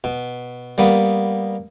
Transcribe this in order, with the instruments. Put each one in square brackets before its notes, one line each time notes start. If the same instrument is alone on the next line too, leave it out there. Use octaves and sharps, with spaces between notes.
[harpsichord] B2
G3 A#3 B3